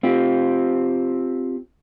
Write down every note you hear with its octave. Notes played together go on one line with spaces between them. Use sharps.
C4 F4 G4